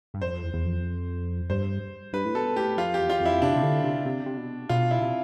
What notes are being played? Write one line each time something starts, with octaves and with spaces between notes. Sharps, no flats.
G2
F2 C5
E2
E2
F2
G2 C5
G2 B4
A2
B2 A4
A2 G4
F2 F4
E2 G4
F4
F2 E4
C3 D4
C3
D3
C3
C3
C3
B2
B2 F4
E4
C3